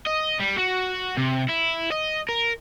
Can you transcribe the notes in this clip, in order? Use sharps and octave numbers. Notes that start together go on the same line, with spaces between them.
D#5
G3
F#4
C3
E4
D#5
A#4